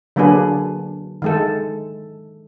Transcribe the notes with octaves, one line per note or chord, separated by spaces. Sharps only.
D3 F#3 A#3 D4 G#4 B4
D#3 G#3 A4